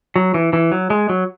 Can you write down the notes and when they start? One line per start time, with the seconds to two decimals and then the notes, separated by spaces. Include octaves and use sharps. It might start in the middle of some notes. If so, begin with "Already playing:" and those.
0.16 F#3
0.34 E3
0.53 E3
0.72 F#3
0.90 G#3
1.09 F#3